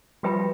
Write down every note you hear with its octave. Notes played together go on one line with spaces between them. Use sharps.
F3 G3 F#4 B4 E5 G5 B5